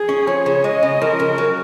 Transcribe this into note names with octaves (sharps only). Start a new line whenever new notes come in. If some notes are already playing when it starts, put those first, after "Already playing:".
Already playing: G#4
C#4
F3 C#5
C#3
G#3 D#5
C#3
F3 A#4
C#3
F#3